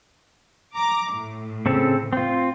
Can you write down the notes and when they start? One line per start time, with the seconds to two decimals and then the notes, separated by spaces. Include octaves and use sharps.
0.75 A#5 D6
1.13 A2
1.66 C#3 C4 A4
2.13 C4 F4